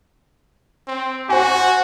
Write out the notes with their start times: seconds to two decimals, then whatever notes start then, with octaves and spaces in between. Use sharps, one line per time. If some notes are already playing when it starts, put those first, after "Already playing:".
0.87 C4
1.29 F#4 C5 G#5